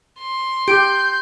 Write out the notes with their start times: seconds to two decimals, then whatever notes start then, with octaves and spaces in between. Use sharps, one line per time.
0.19 C6
0.68 G4 G6 D7